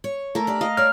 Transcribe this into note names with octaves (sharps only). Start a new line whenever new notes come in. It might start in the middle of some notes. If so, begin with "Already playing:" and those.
C#5
A3 A#3 A#4
D4 G4 D5
D#5 F5
C#5 D5 F6